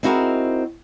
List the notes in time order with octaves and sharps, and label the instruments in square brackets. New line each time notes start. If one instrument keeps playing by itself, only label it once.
[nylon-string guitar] C4 D#4 E4 F#4 G#4 A#4